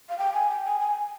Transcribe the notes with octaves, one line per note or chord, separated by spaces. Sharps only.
F5
G5
G#5
G5
G#5
G#5